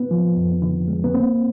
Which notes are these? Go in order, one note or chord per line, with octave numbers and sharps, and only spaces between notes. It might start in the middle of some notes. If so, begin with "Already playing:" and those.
Already playing: B3
F3
F2
D3
G#3
B3
A#3 C4